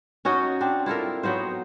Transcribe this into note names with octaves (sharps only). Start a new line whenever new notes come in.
C#4 D#4 F#4 D#5
C4 D4
E4 F4 A4 A#4
F#3 B3 D#4 C5